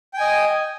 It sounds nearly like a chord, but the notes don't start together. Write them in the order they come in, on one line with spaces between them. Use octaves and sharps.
G5 G#5 D#5